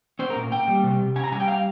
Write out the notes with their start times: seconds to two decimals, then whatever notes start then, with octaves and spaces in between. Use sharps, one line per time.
0.19 C#4 C5
0.30 A#4
0.35 A#2
0.51 A#3 G5
0.68 G3
0.84 C3
0.99 C3
1.16 C#4 G#5
1.24 A#5
1.32 G3 G#5
1.40 G5
1.48 F5